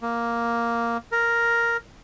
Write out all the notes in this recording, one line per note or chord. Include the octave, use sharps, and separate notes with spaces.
A#3
A#4